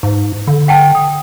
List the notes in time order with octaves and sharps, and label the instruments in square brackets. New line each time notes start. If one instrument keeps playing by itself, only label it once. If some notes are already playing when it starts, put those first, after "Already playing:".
[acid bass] G#2
D3
[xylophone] F#5 G5 A5
D#6